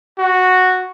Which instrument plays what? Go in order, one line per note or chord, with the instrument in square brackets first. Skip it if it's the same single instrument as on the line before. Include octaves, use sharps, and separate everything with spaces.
[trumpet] F#4